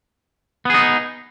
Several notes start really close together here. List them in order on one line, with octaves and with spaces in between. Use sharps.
B3 G#4 D#4